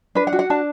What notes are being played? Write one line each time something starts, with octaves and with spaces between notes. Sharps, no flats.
D4 B4
F#5
F#4
F#5
D4 A5